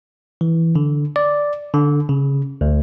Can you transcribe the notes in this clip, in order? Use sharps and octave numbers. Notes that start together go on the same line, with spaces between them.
E3
D3
D5
D3
C#3
D2